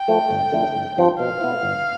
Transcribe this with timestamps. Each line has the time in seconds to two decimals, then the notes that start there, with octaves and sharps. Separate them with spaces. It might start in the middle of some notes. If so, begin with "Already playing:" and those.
Already playing: G5
0.08 F3 A3 E4
0.31 G1
0.52 F2 D3 A3 E4
0.74 G1
0.97 G2 F3 C4 F4
1.20 B2 F5
1.41 B3 E4
1.63 G1